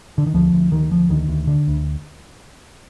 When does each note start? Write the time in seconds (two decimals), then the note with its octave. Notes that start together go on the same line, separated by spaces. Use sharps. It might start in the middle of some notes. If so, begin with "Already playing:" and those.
0.18 D3
0.26 D#3
0.34 D2 F3
0.52 D2
0.71 D2 D#3
0.91 D2 F3
1.09 D2 D#3
1.28 D2
1.47 D3
1.68 D2